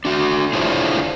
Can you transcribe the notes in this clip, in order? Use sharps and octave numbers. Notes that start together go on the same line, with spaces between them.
D4 F#4
D4 E4 F4 G#4 C5 C#5